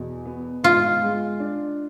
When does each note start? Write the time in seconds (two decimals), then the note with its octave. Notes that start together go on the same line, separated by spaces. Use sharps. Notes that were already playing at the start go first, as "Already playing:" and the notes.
Already playing: E2 B2
0.26 B3
0.64 G#2 F4
1.02 G#3
1.40 D4